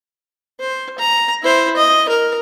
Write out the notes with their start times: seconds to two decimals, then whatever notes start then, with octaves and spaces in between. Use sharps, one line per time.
0.59 C5
0.98 A#5
1.43 E4 C5
1.76 D#5
2.09 A#4